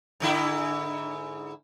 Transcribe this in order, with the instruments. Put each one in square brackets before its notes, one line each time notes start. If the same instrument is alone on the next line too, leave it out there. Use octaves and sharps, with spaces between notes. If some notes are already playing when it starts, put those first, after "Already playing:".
[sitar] G#2 D3 E4